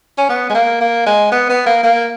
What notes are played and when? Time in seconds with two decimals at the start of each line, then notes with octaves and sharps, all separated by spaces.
0.18 C#4
0.29 B3
0.50 G#3
0.55 A#3
0.81 A#3
1.06 G#3
1.32 B3
1.50 B3
1.66 A#3
1.83 A#3